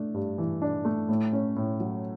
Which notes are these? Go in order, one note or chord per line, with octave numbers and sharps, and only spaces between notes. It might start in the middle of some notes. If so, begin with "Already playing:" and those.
Already playing: A3 D4
G2
E3
D4
A3
A2
C#4
A2
F#3